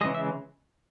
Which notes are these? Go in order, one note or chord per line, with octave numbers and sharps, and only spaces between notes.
C#3 E3 G#3 D#5
E5